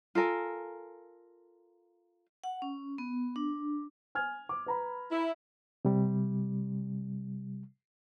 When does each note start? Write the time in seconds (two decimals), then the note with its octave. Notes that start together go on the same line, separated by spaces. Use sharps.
0.15 F4 A4 A#4 G#5
2.44 F#5
2.62 C#4
2.98 B3
3.36 D4
4.15 G#5 F6 G#6
4.49 D6
4.66 B4 A#5 B5
5.12 E4
5.85 C3 G3